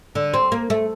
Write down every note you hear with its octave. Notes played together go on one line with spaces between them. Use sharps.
D3
C4
A#3
A3